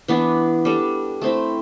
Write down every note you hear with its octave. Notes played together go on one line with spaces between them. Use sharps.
E3 B3 D4
G3 D4 A4
A3 C4 E4